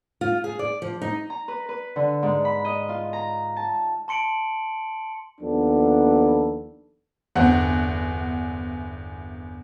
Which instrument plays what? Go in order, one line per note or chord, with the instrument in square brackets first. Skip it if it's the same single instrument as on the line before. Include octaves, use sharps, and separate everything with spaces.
[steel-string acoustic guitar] F4
G#4
D5
F3
D#4
[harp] A#5
B4
B4
D3
G#2
B5
D#5
F4
A#5
A5
[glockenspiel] A5 C6 C#7 D7 F#7
[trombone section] D#2 F3 B3 D4 A4
[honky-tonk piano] G1 E2 C4 F#5